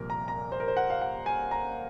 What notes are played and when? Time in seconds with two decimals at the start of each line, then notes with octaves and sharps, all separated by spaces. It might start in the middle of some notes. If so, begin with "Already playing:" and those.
Already playing: C2 A#2 F3 A#4
0.10 A#5
0.28 A#5
0.52 C5
0.60 A#4
0.68 C5
0.77 F#5
0.90 F5
1.02 F#5
1.26 G#5
1.51 A#5